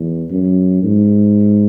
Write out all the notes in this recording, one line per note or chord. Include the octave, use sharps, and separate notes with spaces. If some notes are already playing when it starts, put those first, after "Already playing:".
Already playing: E2
F#2
G#2